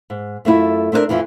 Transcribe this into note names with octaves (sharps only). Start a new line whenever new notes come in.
G#2
F#2 A3 C#4 E4 F4
A3 C4 D4 E4 A#4
F2 E3 F3 E4 F4